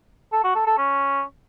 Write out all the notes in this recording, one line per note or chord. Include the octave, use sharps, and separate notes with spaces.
A4
F#4
A4
A4
C#4